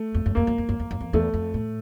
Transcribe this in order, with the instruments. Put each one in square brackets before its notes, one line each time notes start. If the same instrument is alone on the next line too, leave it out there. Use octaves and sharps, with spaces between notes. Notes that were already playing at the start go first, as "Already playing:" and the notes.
Already playing: [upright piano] A3
[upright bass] F2
F#2
[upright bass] F2 [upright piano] A#3
[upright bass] F#2
F2
F#2
F2
F#2
F2
[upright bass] E2 [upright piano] A3
[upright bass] F2
A2